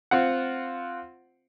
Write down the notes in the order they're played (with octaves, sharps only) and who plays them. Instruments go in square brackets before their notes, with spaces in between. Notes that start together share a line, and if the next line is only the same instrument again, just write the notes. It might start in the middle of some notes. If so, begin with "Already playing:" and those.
[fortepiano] C4 F4 F#5